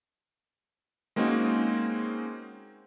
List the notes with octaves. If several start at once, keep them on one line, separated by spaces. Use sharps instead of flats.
G#3 A#3 C4 C#4 D#4 F#4